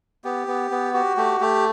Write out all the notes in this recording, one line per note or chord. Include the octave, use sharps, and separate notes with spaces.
B3 G4
B3
B3
F#4 G4
A3 G4
A3 G4